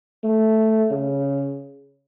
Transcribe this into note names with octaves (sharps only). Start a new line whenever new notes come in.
A3
C#3